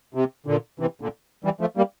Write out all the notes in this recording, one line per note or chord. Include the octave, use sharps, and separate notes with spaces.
C3
A#2 D3
C3 E3
A#2 D3
E3 G3
F3 A3
G3 A#3